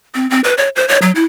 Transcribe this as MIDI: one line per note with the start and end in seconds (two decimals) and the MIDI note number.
0.15 0.29 60
0.30 0.40 60
0.44 0.54 71
0.58 0.69 73
0.76 0.87 72
0.88 0.98 73
1.02 1.11 54
1.15 1.25 64